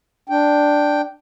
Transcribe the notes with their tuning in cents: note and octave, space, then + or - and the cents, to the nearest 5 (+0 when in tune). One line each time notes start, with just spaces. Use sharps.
D4 +0 G5 +0